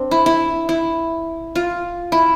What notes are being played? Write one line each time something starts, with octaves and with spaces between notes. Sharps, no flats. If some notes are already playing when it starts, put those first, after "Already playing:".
Already playing: C4 D4
E4
E4
E4
F4
E4